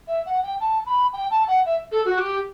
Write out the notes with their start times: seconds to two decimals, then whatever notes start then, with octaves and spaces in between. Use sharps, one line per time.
0.08 E5
0.26 F#5
0.43 G5
0.60 A5
0.86 B5
1.13 G5
1.31 A5
1.48 F#5
1.66 E5
1.92 A4
2.05 F#4
2.18 G4